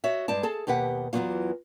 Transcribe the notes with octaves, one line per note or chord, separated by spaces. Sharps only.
F#4 C#5 D#5 E5
G2 G#3 D5 A5
G#4 A4 A5
D#2 B2 G4 B4 F#5
E2 E3 F#3 B3 C#4 F4